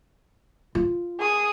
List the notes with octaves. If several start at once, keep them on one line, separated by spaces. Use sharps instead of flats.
F4
G#4 D#6